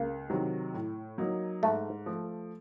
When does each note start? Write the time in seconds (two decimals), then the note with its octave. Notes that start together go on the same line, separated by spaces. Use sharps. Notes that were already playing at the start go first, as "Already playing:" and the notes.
Already playing: C#2 A#3
0.30 C3 D#3 F#3
0.74 A2
1.18 F#3 A#3 D#4
1.63 G#2 A3
2.06 F3 A3